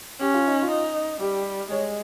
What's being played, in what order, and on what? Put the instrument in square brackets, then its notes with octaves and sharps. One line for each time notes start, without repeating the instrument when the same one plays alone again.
[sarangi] C#4 [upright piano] G4
[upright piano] F4
D#4
F4
[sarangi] D#4
[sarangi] G3 [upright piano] G4
[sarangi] G#3 [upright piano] C#5